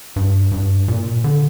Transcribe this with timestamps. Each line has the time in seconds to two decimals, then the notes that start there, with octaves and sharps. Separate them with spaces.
0.16 G2
0.52 G2
0.88 A#2
1.24 D3